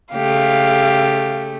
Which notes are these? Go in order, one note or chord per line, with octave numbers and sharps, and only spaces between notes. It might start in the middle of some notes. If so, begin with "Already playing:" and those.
C#3 A3 G4 F5